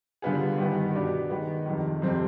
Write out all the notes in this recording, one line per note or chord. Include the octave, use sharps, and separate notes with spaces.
D3 G3 B3 F4 G#4
G2 D#3 B3
B2 B3 D4 G4
D#3 G#3 B3
F2 C3 D#3
F2 C3 G3 C4